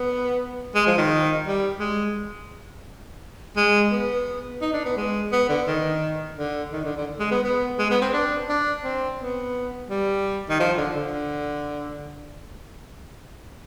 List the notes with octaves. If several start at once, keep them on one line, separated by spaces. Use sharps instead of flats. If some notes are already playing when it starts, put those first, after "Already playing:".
Already playing: B3
G#3
F3
D#3
G3
G#3
G#3
B3
D#4
D4
B3
G#3
B3
D3
D#3
D3
D#3
D3
D3
G#3
B3
B3
G#3
B3
C4
D4
D4
C4
B3
G3
D#3
F3
D3
D3